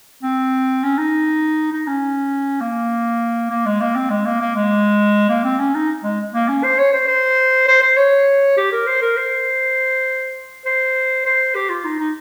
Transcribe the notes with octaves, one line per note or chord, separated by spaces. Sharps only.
C4
C#4
D#4
D#4
C#4
A#3
A#3
G#3
A#3
C4
G#3
A#3
A#3
G#3
A#3
C4
C#4
D#4
G#3
A#3
C#4
C5
C#5
C5
C5
C5
C5
C#5
G4
A#4
C5
A#4
C5
C5
C5
G4
F4
D#4
D#4